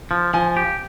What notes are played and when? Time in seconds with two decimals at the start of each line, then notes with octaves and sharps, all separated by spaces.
0.11 F3
0.34 F3 G#5
0.57 G4